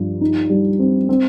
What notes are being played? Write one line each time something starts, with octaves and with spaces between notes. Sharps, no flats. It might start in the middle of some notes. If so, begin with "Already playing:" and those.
Already playing: G2 F3
D#4
G3
C4
C4